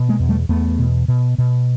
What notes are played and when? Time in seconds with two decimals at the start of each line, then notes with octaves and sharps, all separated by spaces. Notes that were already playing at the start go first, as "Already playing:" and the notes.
Already playing: B2
0.09 G#3 A#3
0.19 E2
0.29 G3 A3
0.49 E2 A3 B3
0.79 B2
1.08 B2
1.38 B2